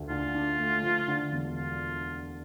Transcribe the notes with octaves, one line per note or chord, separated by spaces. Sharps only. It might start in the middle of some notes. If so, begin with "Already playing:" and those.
Already playing: D2 A3
D3 F4
D4
A3
F3
D3
E1
F4